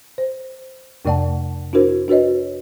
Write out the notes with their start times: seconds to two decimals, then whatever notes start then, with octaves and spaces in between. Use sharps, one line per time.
0.18 C5
1.05 F2 C3 A3 D5 F#5 A5
1.73 D4 E4 F#4 A#4 C5
2.08 D4 F#4 B4 C#5 D#5